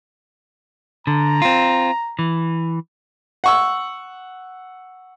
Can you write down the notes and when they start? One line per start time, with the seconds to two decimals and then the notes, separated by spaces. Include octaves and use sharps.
1.07 D3 A#5
1.42 C4 F4
2.19 E3
3.44 F#5 C#6 E6